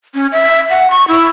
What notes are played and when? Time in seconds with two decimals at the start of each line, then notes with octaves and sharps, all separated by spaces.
0.14 C#4
0.32 E5
0.70 F#5
0.91 C#6
1.08 E4